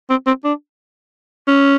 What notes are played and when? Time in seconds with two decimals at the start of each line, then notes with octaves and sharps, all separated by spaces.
0.10 C4
0.27 C4
0.44 D4
1.47 C#4